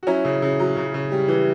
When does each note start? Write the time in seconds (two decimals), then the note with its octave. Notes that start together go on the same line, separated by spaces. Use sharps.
0.03 F#4
0.07 F#3 C#4 E4
0.25 C#3
0.42 C#3
0.59 F#3
0.77 C#3
0.94 C#3
1.12 G3
1.28 E3